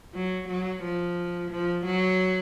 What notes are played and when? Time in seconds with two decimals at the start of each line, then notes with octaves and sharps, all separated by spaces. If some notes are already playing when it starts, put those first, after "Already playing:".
0.15 F#3
0.49 F#3
0.83 F3
1.51 F3
1.86 F#3